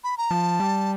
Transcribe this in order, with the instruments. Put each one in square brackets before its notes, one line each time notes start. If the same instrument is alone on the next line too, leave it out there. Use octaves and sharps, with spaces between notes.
[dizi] B5
A#5
[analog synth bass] F3 [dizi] A5
[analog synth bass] G3